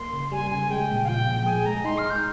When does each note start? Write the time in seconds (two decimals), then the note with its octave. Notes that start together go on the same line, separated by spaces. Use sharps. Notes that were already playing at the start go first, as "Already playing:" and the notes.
Already playing: A#3 C6
0.13 C#3
0.31 G3 G#5
0.51 C#3 G#5
0.70 G#3 G5
0.90 A#2
1.04 F5
1.09 F3 G5
1.27 A#2
1.46 G#4 G#5
1.66 G#3 A#5
1.84 D#4 C6
1.98 F6
2.04 G#3
2.10 G6